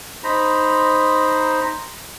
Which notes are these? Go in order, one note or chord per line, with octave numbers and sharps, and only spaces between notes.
D#4 C5 A#5 B5